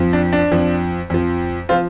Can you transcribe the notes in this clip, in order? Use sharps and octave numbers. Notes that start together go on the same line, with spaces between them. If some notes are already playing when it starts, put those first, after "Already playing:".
Already playing: F2 F3
D4
D4
F2 F3
F2 F3
F3 C4 F4